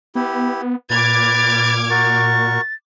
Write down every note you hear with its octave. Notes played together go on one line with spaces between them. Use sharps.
B3 E4 G4
A#2 B4 D6 F6 G#6 A6
F#4 A#4 C#6 A6